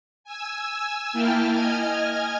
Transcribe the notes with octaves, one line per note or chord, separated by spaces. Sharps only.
G#5 E6
A#3 E4 G5 A5 F6
D#5 G#5 F6 G#6